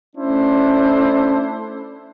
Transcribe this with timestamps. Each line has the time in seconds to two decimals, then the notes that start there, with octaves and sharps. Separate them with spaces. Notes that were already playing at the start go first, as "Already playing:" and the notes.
0.16 A3 C#4 D4 E4 C5